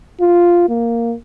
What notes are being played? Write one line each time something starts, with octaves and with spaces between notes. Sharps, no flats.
F4
A#3